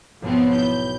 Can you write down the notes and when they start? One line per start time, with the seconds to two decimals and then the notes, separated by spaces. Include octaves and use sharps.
0.22 B1 G#2 F3 B3 C4
0.55 E4 G6